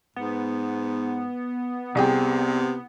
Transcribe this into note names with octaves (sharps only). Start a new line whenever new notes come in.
G#2 B3
C2 C3 G#4 G5